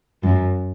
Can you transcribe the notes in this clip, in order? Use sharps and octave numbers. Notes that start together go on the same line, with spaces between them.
F#2